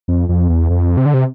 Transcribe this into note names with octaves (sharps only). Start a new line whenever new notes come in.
F2
F2
E2
F2
C3
D3
C3